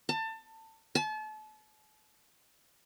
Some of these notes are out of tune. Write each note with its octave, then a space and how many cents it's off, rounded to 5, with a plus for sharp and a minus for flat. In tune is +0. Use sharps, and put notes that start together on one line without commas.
A5 +25
A5 -35